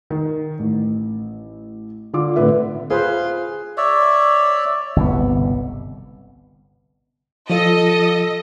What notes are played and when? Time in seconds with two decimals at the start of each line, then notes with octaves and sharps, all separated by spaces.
0.10 D#3
0.59 A1
2.13 D3 F4 D6
2.36 A2 D3 C4 B4 E5
2.90 F4 G#4 B4 C5
3.77 C#5 D5 E5
4.96 G1 C2 B2 B3
7.50 F3 F4 A4 D#5